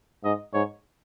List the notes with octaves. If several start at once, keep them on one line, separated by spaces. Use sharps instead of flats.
G#2 D#5
G#2 C#5